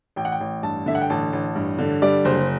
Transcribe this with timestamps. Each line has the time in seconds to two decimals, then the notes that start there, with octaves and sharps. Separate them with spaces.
0.16 A1 G5
0.25 F#5
0.32 G5
0.41 A1
0.63 G2 A5
0.86 D3 E5
0.95 F#5
1.02 G5
1.10 A1 A5
1.33 A1
1.55 G2
1.79 D3
2.02 G3 D5
2.25 F#1 C5